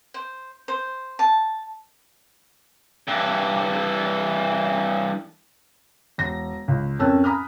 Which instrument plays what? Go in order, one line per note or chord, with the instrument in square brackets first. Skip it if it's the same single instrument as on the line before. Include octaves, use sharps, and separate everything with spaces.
[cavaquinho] C5
C5
A5
[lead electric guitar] G2 E3
[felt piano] E1 A#6
C#2
F2 C#4 A#4 A5 E6 F#6
G#5 A#5 B5 D#6 F6